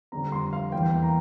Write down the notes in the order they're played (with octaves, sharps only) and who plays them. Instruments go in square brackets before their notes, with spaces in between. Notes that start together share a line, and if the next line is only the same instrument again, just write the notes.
[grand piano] F2 D3 G3 C4 A#5
C6
F5
E2 E3 A#3 G5
A#5